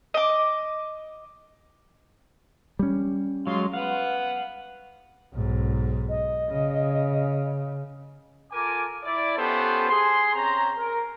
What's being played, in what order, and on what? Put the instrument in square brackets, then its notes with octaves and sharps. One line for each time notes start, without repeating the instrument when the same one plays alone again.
[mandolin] D#5 D6
[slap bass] G3 C#4
[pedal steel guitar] F#3 G#3 [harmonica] F5 C6
[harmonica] B4 F#5 [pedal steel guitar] F5
[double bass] B1 G#2
[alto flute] D#5
[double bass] C#3
[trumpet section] F4 A4 A#4 G#5 D6
E4 D5
B3 C#4 F4 G4 A4 C5
G#4 C6
C4 C#4 C5 A#5
A#4